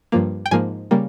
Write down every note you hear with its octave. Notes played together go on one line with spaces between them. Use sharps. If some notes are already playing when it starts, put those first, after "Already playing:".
G2 F3 A#3
G5
G#2 F3 A#3 G#5
C#3 G3 A#3